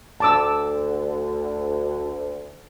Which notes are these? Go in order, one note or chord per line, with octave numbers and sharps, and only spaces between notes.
D2 D3 A5 D6 E6